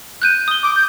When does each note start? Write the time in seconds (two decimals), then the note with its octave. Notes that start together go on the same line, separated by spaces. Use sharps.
0.22 F#6 G6 D#7
0.48 D#6 G7
0.63 D6
0.75 G6